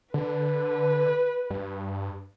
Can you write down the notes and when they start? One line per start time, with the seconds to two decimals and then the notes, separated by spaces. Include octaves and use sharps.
0.14 D3 B4
1.50 G2